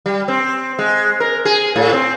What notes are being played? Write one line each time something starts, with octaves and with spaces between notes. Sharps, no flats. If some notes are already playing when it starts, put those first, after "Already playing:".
G3
C4
G#3
A#4
G#4
A2
C4